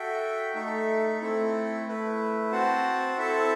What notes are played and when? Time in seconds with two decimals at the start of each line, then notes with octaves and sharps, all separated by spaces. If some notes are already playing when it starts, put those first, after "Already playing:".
Already playing: F#4 A4 E5 G5
0.54 A3 D#4 A4 E5
1.20 A3 C4 E4 A4
1.86 A3 E4 B4
2.52 C4 F#4 C5 F#5 A5
3.17 C4 E4 A4 E5 A5